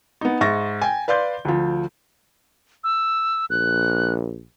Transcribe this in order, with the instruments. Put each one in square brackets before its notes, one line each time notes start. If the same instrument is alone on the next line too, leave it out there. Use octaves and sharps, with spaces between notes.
[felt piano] B3 D#4
G#2 E5 C#6 A6 A#6
G5 G#5
B4 D5 F5 C6 G6
D2 F3
[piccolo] E6
[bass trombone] A#1 [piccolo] F#6